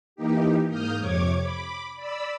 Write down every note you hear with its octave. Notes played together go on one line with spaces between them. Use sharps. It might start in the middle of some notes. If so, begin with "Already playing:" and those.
E3 A#3 D#4 G4
G#2 A#3 D#6 F6 G6
F2 C3 C#5 D6 G#6
B5 D6
D5 B5 E6